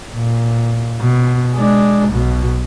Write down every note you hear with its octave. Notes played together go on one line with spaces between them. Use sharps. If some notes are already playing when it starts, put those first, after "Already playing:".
A#2
B2
G#3 D4
B1 B2